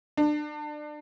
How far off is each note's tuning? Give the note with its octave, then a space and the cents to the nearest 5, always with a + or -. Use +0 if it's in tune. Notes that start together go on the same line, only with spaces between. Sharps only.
D4 +30